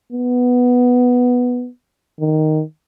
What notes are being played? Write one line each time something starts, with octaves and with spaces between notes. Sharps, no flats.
B3
D#3